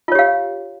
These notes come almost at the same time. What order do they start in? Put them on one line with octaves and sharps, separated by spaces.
F4 C#5 G4 F5